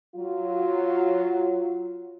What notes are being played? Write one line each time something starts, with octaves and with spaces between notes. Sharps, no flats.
F#3 F4